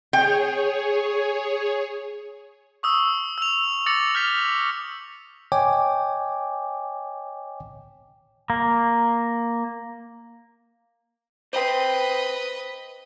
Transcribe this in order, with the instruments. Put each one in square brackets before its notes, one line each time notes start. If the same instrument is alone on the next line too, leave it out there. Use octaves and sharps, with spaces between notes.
[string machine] G#4 C#5 [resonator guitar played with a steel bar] G5
[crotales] C#6 D#6 E6
E6 F7
D6 E6 A6 A#6 C#7 F#7
F6 G6 B6 F7 G7
[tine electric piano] C#5 D#5 G5 G#5 D6
[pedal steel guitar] A#3
[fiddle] B4 D#5 [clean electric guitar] C5 G5